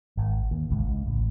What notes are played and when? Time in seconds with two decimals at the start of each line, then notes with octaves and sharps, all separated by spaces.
0.17 G#1
0.51 D#2
0.70 G#1 C#2
0.87 C#2
1.06 A1